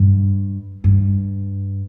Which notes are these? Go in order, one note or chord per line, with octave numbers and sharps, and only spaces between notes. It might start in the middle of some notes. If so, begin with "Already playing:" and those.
Already playing: G2
G2